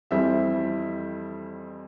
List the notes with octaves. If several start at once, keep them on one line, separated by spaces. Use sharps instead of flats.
F2 E3 G3 C4 E5